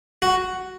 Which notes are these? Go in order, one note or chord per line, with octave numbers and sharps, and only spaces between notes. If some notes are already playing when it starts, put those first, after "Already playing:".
F#4